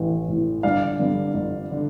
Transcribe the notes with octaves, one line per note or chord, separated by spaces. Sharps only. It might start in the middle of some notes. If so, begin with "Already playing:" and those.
Already playing: A1 A2 E3
A2 E3
G1 D5 F5
G2 D3
G1
D3